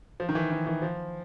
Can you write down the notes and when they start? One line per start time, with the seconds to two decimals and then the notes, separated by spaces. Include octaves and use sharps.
0.20 F3
0.29 D#3
0.35 E3
0.51 D#3
0.67 E3
0.82 F3